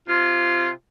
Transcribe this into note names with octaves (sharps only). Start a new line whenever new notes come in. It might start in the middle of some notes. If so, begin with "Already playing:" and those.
C3 F4